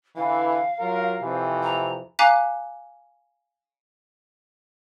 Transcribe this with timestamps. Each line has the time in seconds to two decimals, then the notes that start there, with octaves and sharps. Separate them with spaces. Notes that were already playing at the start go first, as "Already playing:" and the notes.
0.16 D3 E3 F5
0.79 F#3 F4 A#4
1.21 F2 C3 E3
1.63 A#5
2.19 F5 G#5 A#5 D6 F#6 B6